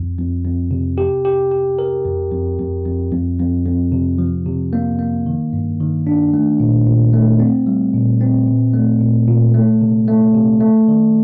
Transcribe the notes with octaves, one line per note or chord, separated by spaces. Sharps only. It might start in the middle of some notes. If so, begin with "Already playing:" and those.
Already playing: F2
F2
F2
C3
G4
G4
G4
A#4
F2
F2
F2
F2
F2
F2
F2
C3
F3
C3
A#3
A#3
D#3
G2
D#3
D4
A3
A#2
A#2
A3
C4
G3
A#2
C4
A#2
A3
A#2
A#2
A3
C3
A3
C3
A3
D#3